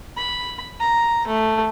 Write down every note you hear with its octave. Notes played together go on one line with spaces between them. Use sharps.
B5
A#5
A3